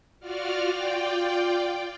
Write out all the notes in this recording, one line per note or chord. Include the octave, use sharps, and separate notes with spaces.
F4 F#4 D5 F6
F4 D5 G5